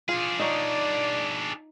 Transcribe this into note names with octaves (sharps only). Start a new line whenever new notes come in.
D4 F4 G#4
D#4 C#5 D5